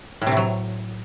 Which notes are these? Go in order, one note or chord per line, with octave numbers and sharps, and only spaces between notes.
A2
C3
A2
F#3